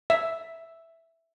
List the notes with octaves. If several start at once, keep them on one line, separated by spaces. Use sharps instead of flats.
E5